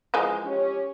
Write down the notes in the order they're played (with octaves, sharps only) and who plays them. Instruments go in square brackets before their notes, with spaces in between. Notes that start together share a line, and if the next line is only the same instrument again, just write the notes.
[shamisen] E3 F3 G#3
[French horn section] C#4 G4